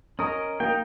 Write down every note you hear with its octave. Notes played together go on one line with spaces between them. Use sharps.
C#4 A#4 D#5 D#6
A#3 D#4 G5